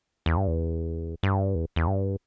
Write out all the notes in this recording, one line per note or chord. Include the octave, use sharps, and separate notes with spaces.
E2
G2
E2
G2
E2
E2
G2